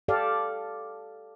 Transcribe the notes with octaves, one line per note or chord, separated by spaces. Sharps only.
G4 A4 D5 F5